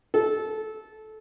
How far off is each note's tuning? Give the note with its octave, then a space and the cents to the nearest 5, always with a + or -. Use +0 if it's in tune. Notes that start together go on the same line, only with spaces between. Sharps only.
A4 -20